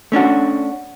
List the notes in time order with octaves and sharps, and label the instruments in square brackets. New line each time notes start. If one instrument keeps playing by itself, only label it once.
[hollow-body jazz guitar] A3 C#4 D4 F#4